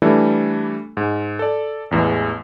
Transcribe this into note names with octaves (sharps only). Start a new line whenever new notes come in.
E3 G3 A3 D4 E4 A4
G#2
A4 D5
A1 E2 E3 G#3